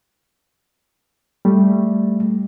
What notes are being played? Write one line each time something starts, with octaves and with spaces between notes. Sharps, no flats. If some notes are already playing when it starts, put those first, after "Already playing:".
G3 A3